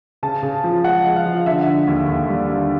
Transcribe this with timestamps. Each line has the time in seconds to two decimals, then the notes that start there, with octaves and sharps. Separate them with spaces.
0.23 C#3 A5
0.43 C#3
0.64 F3
0.84 G#3 F#5
1.05 G#3
1.16 F5
1.25 F3
1.46 D3 E5
1.67 D3
1.87 D#2
2.08 D#2
2.29 G3
2.49 D3